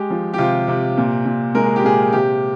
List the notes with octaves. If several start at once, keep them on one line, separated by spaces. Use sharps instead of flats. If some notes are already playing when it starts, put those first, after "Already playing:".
Already playing: G#3 G4
F3
G4
C3 F4
C3
A#2
A#2
G#3 A#4
G#4
G4
A#2 G#4
C3 G4